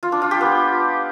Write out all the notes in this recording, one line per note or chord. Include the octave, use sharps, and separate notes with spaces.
F4
D4
F4
G4
B3